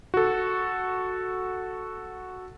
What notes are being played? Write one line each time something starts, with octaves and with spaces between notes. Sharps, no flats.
F#4 A4